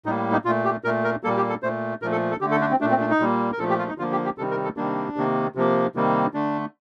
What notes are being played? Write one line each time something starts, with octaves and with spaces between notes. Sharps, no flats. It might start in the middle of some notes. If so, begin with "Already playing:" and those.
A2 G3 A#3 D#4
D#4
A#2 A3 F4
G4
A#2 A3 A#4
A#4
A#2 G3 A#3 A4
G4
A4
A#2 A3 C5
A#2 F3 A3 A#4
A4
A4
D3 A3 G4
A4
D4
C4
A#2 A3 D4
C4
D4
D#4
A#2 G3 A#3
A#4
A#2 F3 A3 A4
G4
F4
D#4
D3 F3 A#3 F4
G4
G4
C3 D#3 G3 A4
A#4
A4
C3 D#3 G3 A#3 D4
C3 D#3 A#3
C3 F3 A#3
C3 D#3 G3 A#3
D3 A3 D4